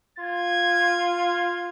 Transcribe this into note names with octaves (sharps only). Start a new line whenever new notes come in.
F4 G#6